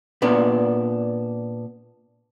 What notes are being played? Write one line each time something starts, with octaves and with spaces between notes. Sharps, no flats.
A#2 B3 D4